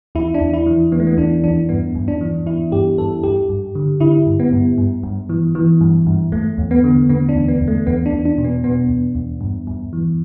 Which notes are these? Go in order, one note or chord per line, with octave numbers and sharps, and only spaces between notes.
E2 E4
D4
E2
E4
E3
E3 B3
A3
B3
E2 D4
E2 D4
G2 B3
G2
D4
E3
E3 E4
G2 G4
G2 A4
G2 G4
G2
D3
D3 E4
G2
B3
G2
G2
G2
E3
E3
G2
G2
E2 A3
E2
B3
D3
D3 B3
D4
E2
B3
E2
A3
E2 B3
D4
E2
D4
B2
B3
B2 B3
E2
E2
G2
G2
E3